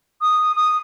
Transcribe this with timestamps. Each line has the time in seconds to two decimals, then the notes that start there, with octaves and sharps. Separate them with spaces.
0.22 D#6
0.56 D#6